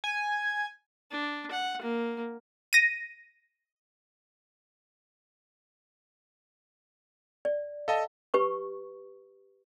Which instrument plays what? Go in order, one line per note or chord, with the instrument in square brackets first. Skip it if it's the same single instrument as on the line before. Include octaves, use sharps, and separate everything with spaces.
[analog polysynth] G#5
[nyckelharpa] D4
F#5
A#3
[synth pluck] A#6 D#7
[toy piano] D5
[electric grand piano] A4 D#5 A5 [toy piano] F5
[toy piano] G4 B4 C#6